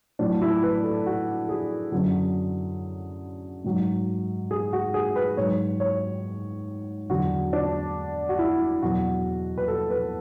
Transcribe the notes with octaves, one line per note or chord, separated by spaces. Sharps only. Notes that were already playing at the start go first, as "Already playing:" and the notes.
A2 F#3 D4
E4
B4
A4
F#4
G#4
F#2 D3 F#3
G#2 F#3
G#4
F#4
G#4
B4
G#2 F#3 C#5
C#5
E2 D3 F#3 F#4
D4
F#4
E4
E2 B2 F#3 F#4
B4
A4
B4